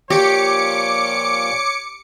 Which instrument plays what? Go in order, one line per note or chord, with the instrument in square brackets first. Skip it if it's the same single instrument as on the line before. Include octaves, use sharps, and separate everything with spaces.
[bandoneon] A#2 F3 [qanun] G4 [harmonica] C#5 [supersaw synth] D6 C#7